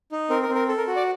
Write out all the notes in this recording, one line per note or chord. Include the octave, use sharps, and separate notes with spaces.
D#4
C4 A#4
A#4
C4
A#4
A4
A#4
F#4
D5